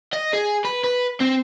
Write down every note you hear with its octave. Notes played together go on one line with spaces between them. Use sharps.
D#5
G#4
B4
B4
C4